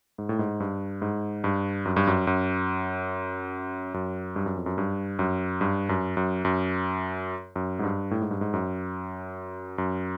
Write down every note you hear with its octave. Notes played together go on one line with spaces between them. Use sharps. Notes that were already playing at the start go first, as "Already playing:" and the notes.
G#2
A2
G#2
G2
G#2
G2
F#2
G2
F#2
F#2
F#2
G2
F#2
F2
F#2
G2
F#2
G2
F#2
F#2
F#2
F#2
G#2
G2
A2
G#2
G2
G#2
F#2
F#2